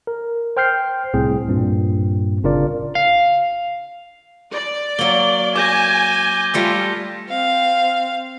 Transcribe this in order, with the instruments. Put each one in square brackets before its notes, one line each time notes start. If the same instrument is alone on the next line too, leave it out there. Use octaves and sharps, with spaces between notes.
[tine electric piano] A#4
C5 G5 F6 G6 C7
C2 A2 C4 G#4
G2 A#2 C4
G1 C#3 D4 F4 A#4 D5
[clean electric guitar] F5
[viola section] D5
[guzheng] F#3 A#3 [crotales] G7
[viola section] G#5 [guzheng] A#5 [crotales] D6 G6 A#6
[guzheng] G3 A3 E5 [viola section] F4
[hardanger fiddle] C4 F5